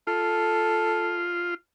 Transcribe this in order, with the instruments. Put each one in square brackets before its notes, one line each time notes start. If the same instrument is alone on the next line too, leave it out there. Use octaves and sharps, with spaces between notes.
[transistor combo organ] F4 [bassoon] A4